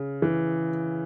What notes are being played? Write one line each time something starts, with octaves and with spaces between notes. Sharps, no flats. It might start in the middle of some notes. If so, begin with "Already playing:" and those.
Already playing: C#3
E3